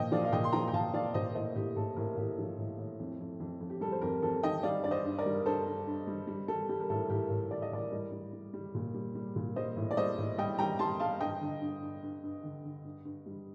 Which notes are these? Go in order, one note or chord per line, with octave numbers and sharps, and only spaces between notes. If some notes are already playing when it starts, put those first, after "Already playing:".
Already playing: A#2 F3 D#5 G5
F3 D5 F5
F5
A#2 D#5 G5
C6
F3 G5 A#5
G5
A#2 F5 A5
F3 D5 F5
A#2 C5 D#5
A2 C5 D#5
A2 G4
A2 A4
A2 G4 A#4
A2 G4
F3
A2
A2
F2
F2
F2
F2
G4
G3 A4
C5
F2 G4 A#4
F2 A4
D#3 D#5 G5
G3 D5 F5
G2 D5
C5 D#5
G2
A#4 D5
G3
G2 A4 C5
G2
G2
G3
G3
G3 A4
G3 G4
A#4
A2 A4
A2 G4 A#4
A2
A2 D5
D#5
A2 A#4 D5
G3
G3
G3
G3
A#2
G3
G3
A#2
G3 C5 D#5
A2
D5
G3 C5 D#5
A2
G3 D#5 G5
G3 G5 A#5
G3 A5 C6
G3 F5 A5
G2 D#5 G5
D3
G2
G2
G2
G2
D3
D3
G2
G2
G3